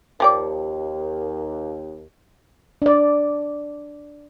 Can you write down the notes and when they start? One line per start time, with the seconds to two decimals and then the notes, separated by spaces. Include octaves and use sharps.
0.20 D#2 F3 G4 D5
2.82 D4 D5